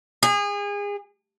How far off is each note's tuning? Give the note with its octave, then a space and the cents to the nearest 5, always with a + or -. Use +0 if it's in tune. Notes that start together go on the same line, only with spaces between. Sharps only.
G#4 -30